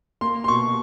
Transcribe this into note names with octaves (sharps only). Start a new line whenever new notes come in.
A#3 C6
C6
B2 C#6